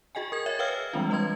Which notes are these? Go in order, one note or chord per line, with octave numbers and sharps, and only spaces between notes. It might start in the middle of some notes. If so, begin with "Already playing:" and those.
F#4 G#4 D#5 G5 G#5
A#4 G#6
C#5 E5 G#6
A#4 B4 F5 G5 E6 F6
E3 G3 G#3 C4 D4 F4
G3 B4 D#5 C6 G#6